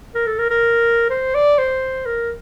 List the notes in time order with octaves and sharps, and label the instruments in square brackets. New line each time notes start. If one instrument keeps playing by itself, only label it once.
[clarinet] A#4
A4
A#4
A#4
C5
D5
C5
A#4